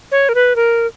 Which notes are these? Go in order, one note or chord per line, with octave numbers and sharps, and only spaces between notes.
C#5
A#4
B4
A#4